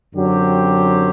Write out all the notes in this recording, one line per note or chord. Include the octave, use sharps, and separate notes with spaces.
F#2 D3 F#3 C4 G4